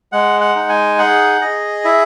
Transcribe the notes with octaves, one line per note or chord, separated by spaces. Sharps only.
G#3 F#5
F#5
D#4
G#5
G#4 F#5
G#4 D#5
E4 E5